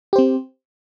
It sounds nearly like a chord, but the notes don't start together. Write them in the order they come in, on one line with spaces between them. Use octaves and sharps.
G4 C5 C4